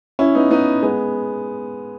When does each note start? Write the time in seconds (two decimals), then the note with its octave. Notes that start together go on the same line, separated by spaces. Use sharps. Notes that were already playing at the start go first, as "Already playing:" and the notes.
0.19 C#4 E4
0.35 B3 D#4
0.50 B3 D#4
0.82 G#3 B3